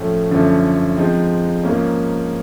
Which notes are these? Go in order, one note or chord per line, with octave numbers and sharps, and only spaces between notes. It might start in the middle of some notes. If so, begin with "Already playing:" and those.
Already playing: A2 F3 A3 C#4
F#2 D3 F3 A3 C#4
F3 G#3 C4 D#4
G#2 F3 A#3 C#4